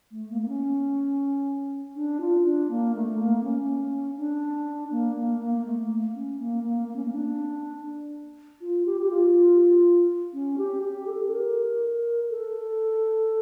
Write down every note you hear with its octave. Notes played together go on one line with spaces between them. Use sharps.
A3
A#3
A#3
C#4
D4
F4
D4
A#3
A3
A#3
C#4
D4
A#3
A#3
A#3
A3
C#4
A#3
A#3
A#3
C#4
A#3
D4
F4
G4
G4
F4
C#4
G4
G4
A4
A4
A#4
A4